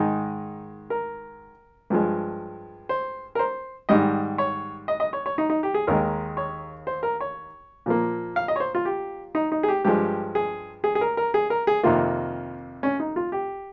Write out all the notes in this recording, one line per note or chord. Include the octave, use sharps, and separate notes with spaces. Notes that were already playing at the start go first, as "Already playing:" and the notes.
Already playing: G#2 D#3 G#3 D#4
A#4
G2 F3 G#3
C5
A#4
C5
G#2 D#3 G3 D#5
C#5
D#5
D#5
C#5
C#5
D#4
D#4
G4
G#4
D#2 D#3 G#3 A#4
C#5
C5
A#4
C#5
A#2 F3 A#3
F5
D#5
C#5
C5
F4
G4
D#4
D#4
G#4
G4
G2 F3 G#3 G4
G#4
G#4
G#4
A#4
A#4
G#4
A#4
G#4
F2 C3 D#3 A#3 F4
C#4
D#4
F4
G4